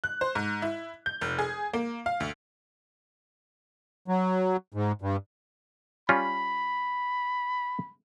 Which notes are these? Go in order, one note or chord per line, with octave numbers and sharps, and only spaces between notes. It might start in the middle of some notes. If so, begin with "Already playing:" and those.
F#6
C5
G#2
E4
G6
F1
G#4
A#3
F5
D2
F#3
G#2
G2
G3 C#4 F4 B5